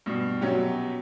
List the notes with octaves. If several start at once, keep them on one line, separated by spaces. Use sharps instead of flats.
G2 B2
A#1 B2 F#3 C#4 G4